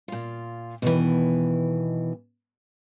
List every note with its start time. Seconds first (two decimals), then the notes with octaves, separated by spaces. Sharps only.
0.08 A#2 F4
0.82 B2 D#3 E3